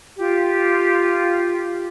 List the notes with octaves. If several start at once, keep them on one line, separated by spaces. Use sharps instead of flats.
F4 G4